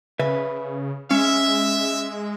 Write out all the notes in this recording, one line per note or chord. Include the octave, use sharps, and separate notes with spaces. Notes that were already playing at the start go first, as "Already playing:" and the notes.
C#3 B4 E5
G#3 C#4 E5